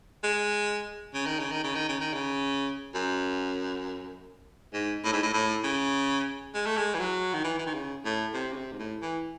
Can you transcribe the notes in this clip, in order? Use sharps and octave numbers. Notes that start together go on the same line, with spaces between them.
G#3
C#3
D#3
C#3
D#3
C#3
D#3
C#3
D#3
C#3
F#2
G#2
A2
G#2
A2
A2
C#3
G#3
A3
G#3
E3
F#3
D#3
E3
E3
D#3
C#3
A2
C3
C#3
C3
G#2
A2
E3